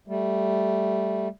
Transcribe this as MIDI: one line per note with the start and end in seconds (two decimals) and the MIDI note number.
0.08 1.28 55
0.08 1.28 57